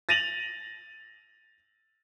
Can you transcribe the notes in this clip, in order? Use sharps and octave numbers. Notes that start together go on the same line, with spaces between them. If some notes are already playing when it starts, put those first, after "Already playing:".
A6 A#6 D#7 F7 F#7